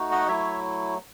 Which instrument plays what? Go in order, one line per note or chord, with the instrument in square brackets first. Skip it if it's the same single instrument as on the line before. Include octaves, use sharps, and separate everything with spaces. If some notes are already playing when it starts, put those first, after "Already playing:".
Already playing: [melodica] A3 D#4 F#4
D#5 F#5
F#3 A3 E4 C#5 E5